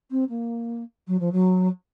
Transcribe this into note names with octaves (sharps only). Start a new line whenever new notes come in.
C4
A#3
F#3
F3
F#3